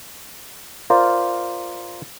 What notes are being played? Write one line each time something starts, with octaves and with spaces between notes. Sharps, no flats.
F4 A#4 C5 D5